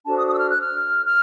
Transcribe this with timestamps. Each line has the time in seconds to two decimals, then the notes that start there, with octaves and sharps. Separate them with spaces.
0.05 D4 F#4 A4 C5 A5
0.17 D#6
0.28 D#6
0.35 E6
0.38 F6
0.50 F#6
0.62 F6
1.06 F6